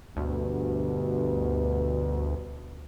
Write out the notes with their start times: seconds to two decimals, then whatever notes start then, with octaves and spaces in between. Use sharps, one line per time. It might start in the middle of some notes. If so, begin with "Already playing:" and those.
0.17 D2 G2 B2